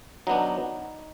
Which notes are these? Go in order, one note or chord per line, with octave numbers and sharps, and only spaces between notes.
F#3 B3 D4 D#4